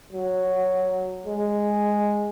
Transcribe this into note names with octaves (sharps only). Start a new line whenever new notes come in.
F#3
G#3